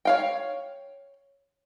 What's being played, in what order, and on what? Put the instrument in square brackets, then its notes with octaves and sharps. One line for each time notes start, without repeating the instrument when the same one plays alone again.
[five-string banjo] C#5 F5 G5